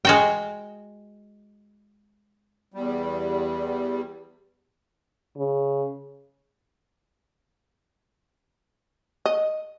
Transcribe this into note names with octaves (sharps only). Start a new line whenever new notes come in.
G#3 F#4 G5
E2 G3
C#3
D#5